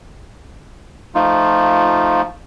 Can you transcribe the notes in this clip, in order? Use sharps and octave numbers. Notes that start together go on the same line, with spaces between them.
F3 A3 D#4 F4